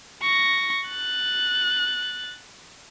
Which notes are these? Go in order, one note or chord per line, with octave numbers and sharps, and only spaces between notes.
C#6 A#6
F#6 A6